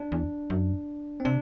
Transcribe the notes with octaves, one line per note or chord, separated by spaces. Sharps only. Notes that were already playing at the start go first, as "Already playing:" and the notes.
Already playing: D4
E2
F#2
C4
C3 D4